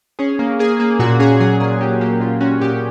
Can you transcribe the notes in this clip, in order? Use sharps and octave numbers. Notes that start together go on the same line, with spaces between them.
C#4 G#4
A#3
A#3 G#4
A#3
A#2 F#4
C#4 G#4
F#3 G#4
A#2 G#4
C#4 G4
A#3 G4
A#2 F4
C#4 F#4
A#2 G4